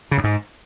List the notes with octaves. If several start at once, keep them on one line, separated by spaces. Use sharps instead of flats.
C#3
F#2
G#2